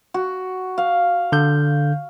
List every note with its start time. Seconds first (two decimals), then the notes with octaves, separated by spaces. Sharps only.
0.14 F#4
0.78 F5
1.32 D3 G6